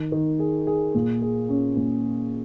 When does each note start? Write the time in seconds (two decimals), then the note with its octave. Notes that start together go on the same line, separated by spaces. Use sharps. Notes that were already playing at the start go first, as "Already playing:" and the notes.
Already playing: D#3
0.12 D#3
0.39 G#4
0.67 G#4
0.95 A#2
1.22 G#4
1.49 C#4
1.77 A#2